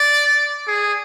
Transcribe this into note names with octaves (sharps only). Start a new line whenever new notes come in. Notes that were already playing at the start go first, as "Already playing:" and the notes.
Already playing: D5
G#4